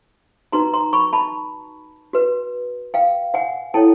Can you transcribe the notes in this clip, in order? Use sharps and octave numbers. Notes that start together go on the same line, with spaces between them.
D#4 F#4 B4 A#5 C6
A#5 C6
B5 C#6
A5 B5
F#4 B4
F5 G5
F#5 G#5
E4 A4 C#5 G5 A5